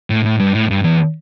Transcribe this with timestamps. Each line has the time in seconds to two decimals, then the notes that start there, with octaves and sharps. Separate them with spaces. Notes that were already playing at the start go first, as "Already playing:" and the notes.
0.10 A2
0.25 A2
0.39 G2
0.54 A2
0.70 G2
0.84 E2